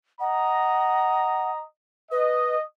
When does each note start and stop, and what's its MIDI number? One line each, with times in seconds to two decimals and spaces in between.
0.20 1.64 75
0.20 1.51 78
0.20 1.64 82
2.11 2.56 71
2.11 2.63 75